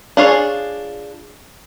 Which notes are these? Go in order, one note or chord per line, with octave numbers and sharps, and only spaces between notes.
D4 F4 G#4 C#5